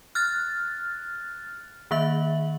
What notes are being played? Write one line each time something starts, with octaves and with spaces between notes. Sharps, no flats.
F6 F#6 A6
D#3 A#3 E5 F#7